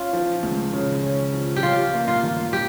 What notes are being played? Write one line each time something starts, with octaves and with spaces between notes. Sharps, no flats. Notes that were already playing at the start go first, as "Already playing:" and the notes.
Already playing: C#4 F4
F3
C#2
C#3
C#4
F3
G4
C#4 F4
A#3
F4
G2
G4